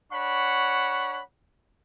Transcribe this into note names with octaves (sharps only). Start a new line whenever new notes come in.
D4 C#5 F#5 B5 C#6